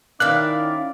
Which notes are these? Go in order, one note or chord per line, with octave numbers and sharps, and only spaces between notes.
D#3 C#4 E4 A#4 D5 F5 F#6